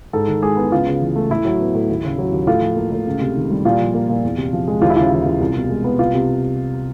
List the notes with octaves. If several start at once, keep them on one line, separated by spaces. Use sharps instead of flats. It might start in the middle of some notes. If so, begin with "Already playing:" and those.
G#2 A4
D#3
G#3 G#4
B3
C#2 F4
C#3
E3
A3
A2 E4
F#3
B3
A2
D#2
C#3
F#3
D#2
A2 F4
F3
A#3
A2
C#2
C3
D#3
G3
A#2 F4
F3
A#3
A#2
E2
C3
F3
G#3
D#2 F4
E4
C#3 F4
E3
D#2
C2
B2
G#3
B3
C2 F4
C3